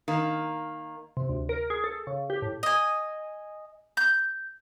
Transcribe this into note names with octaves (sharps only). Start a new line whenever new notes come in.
D#3 A#3
C3
D2
A#4
G#4
A4
C#3
G4
A2
D#5 G#5
G6